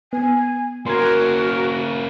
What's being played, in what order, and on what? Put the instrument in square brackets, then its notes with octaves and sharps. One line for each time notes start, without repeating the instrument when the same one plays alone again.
[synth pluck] B3 [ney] G#5
[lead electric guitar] A#3 C#4 [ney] F#4 [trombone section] A#4 [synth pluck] C6 G#6